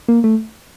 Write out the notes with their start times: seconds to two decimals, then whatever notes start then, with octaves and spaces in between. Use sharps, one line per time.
0.08 A#3
0.24 A3